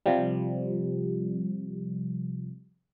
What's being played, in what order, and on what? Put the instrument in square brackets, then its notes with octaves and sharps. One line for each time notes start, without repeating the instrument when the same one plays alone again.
[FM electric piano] C3 F3 G3